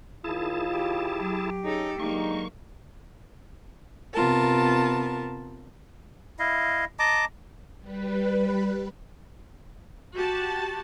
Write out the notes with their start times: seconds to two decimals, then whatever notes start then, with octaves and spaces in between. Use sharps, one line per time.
0.24 D#2 D#3 E4 F4 G#4 A5
0.73 G4
1.18 F#3
1.64 C#4 D#4 G#4 A4
1.99 D3 F#3 G#3 A#3 D#4 C#6
4.14 C3 B3 F4 A#4 A5
6.39 E4 D#5 F5
6.99 D#5 A5 A#5 D6
7.80 G3 B4
10.15 F#4 G4 A5